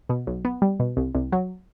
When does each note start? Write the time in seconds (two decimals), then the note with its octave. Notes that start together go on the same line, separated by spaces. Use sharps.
0.09 B2
0.27 B1
0.45 B3
0.62 G3
0.80 B2
0.97 C2
1.15 C2
1.32 F#3